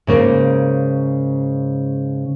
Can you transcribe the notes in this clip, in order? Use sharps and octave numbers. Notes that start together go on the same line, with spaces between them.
G#2 C#3 A#3